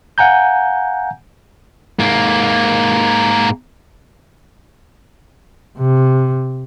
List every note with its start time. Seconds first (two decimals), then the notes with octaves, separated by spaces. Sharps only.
0.18 F5 F#5 G#5 A#5 G6
1.99 G#2 A#3
5.78 C3